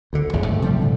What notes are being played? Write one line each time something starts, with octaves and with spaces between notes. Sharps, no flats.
D2 D3
G#1 E2 G#2 C#3
G#2 A3
C3 F3 G3
A2 D3